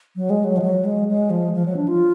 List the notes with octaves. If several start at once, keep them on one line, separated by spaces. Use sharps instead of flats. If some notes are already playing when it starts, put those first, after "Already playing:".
F#3
G#3
F#3
F3
F#3
G#3
G#3
F3
F3
F#3
D4
F4